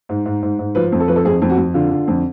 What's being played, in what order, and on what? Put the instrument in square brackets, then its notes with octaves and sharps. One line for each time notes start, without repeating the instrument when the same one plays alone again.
[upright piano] G#2
G#2
G#2
G#2
F3 B4
F2
A4
F3 B4
A4
F2 G#4
F2
F#4
F2
D3 F4
D3
F2